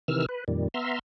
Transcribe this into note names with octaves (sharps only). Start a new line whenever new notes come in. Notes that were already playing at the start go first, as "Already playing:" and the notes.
C3 D#3 E3 E6 F6
B4
F2 A#2 D#3 G3
B3 E5 A#5 C6 E6 F6